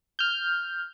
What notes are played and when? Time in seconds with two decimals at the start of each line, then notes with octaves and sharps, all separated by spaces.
0.19 F6 G6